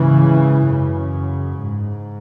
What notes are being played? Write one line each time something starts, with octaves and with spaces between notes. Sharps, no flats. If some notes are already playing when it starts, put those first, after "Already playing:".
Already playing: G#2 C#3 E3
F#2 C#3
G#2